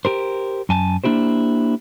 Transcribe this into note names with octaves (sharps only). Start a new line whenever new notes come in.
G4 A#4 C5
F#2 G#5 A5
A#3 D4 E4 G4 C5